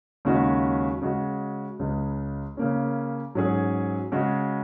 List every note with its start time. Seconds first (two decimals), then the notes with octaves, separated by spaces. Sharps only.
0.25 D#2 C#3 G#3 C#4 F#4
1.02 C#3 G#3 F#4
1.79 C#2 C#3 G#3
2.57 C#3 A#3 C#4
3.35 G#2 F#3 C#4 G#4
4.12 C#3 G#3 F#4